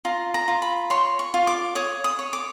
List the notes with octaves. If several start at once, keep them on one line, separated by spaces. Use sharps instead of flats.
F4 A#5
A#5
F4
B5
C#5 C6
C#6
F4
D6
C#5 D#6
D#6
C#5
D6